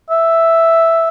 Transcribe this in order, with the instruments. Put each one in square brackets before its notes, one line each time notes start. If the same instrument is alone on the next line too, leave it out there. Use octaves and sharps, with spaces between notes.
[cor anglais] E5